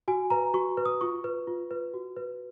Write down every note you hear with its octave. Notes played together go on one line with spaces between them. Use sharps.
F#4 G#5
B4 A#5
F#4 C#6
B4
D#6
F4 C#6
B4
F4
B4
F#4
B4